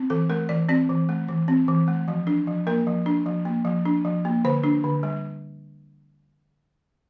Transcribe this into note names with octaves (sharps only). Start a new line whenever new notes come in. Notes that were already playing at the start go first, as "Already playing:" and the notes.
Already playing: C4
E3 A4
A3 A#4
E3 D5
C4 D5
E3
A3
E3
C4
E3
A3
F3
D4
F3
A#3 A#4
F3
D4
F3
A#3
F3
D4
F3
A#3
D3 C5
D4
D3
G3